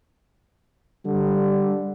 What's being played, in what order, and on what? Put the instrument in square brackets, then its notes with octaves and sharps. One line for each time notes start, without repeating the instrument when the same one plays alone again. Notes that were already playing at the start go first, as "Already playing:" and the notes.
[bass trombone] D3 [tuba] G3